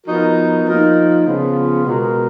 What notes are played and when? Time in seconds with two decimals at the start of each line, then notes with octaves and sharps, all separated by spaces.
0.06 F3 B3 D#4 F#4 A#4
0.66 F3 A#3 D#4 A#4
1.26 C#3 F3 B3 F4
1.85 B2 G#3 B3 F#4 A#4